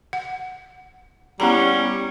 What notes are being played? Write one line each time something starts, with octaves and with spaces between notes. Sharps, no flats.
F#5
G3 B3 C#4 E4 A#5